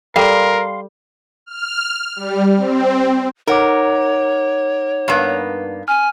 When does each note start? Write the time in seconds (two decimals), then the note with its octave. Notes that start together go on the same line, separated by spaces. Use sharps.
0.16 G3 A4 A#4 F5 G5 C6
1.46 F6
2.16 G3
2.57 C4
3.47 D#4 A#4 C#5 F#5 D6
5.08 G2 A#3 B3
5.88 G#5 F6